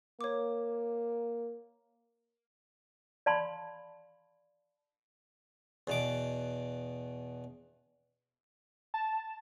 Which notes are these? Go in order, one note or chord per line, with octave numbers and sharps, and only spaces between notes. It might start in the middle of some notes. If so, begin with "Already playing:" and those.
A#3 C#5 D6
D5 F5 A5 B5 C6
E2 B2 D6
A5